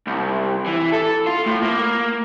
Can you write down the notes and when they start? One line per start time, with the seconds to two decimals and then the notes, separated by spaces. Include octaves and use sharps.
0.07 C2
0.66 E3
0.92 A4
1.27 F4
1.46 A2
1.62 A#3